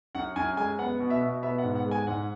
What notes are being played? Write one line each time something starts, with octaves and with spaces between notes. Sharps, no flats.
F#2 F#5
F#2 G#5
G#3 G#5
B3 F#5
B2
E5
B2
B3 E5
F#5
G#2
F#5
G#3
G#5
G#2 F#5